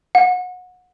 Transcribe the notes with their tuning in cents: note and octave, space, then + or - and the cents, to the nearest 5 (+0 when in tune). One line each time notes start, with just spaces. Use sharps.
F#5 -25